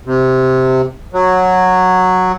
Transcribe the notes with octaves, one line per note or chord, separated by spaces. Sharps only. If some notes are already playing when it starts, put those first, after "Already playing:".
C3
F#3